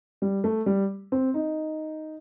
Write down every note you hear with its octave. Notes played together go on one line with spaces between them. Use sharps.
G3
A3
G3
C4
D#4